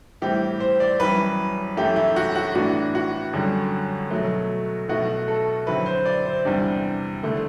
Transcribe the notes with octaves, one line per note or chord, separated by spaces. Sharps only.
A2 E3 G3 C4 E4 G4
C5
D5
F#2 E3 G3 B4
F#2 E3 A3 E4 G4
E4
F#4
F#4
A2 E3 B3 D4 F#4
F#4
F#2 D3 G3
B2 F#3 A3
B2 F#3 A3 E4 F#4
A4
D3 F#3 C4 E4 B4
C5
D5
C5
E2 C3 G3 D4
D3 A3 E4